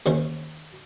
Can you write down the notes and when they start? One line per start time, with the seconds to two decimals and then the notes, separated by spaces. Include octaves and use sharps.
0.06 D#2 C#3 C5 C#6